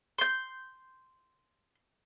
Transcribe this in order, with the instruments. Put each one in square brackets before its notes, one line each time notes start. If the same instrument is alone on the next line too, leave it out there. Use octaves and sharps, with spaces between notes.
[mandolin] C6 G6